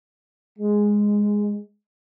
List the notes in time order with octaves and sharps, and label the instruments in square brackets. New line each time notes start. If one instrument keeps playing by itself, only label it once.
[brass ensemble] G#3